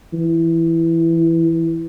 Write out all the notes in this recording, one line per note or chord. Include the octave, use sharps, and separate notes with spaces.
E3